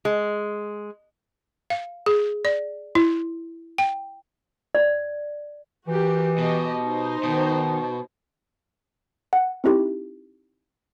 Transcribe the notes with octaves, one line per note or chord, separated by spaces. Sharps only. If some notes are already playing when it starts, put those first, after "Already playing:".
G#3
F5
G#4
D5
E4
G5
D5
E3 F#4 G4 A#4
B2 G4 D#5
D#4 C5
B2 D#3
F#5
C4 D#4 E4 G4